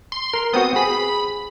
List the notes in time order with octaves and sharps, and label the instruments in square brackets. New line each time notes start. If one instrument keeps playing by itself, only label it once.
[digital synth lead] C6
[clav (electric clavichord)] A#4
[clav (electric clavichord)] B3 C4 F#4 [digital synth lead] D#6
[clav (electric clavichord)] G#4 [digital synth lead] B5